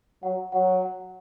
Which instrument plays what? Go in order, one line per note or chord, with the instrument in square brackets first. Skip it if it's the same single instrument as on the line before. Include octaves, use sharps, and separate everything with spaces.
[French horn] F#3 [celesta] F#5
[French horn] F#3 [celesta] F#5
[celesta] F#5